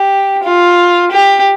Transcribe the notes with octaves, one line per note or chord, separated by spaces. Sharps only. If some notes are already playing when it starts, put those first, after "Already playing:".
Already playing: G4
F4
G4